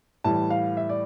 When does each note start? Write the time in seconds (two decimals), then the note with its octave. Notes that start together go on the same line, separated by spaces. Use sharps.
0.24 A2 E3 G3 A5
0.51 F5
0.77 E5
0.89 D5